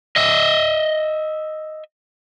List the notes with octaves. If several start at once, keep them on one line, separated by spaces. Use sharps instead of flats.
D#5 E5